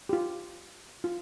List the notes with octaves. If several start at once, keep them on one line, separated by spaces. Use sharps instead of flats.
G4
F4
F4